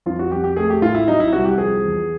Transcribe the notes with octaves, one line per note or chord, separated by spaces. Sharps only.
F2 F4
F#4
F2 G4
G4
A3 G#4
G4
A2 F4
E4
F#3 D#4
E4
C2 F#4
G4
F3 G#4
E2